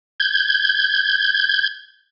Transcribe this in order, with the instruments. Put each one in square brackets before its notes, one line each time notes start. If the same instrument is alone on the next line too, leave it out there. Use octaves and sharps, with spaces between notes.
[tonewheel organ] G6 G#6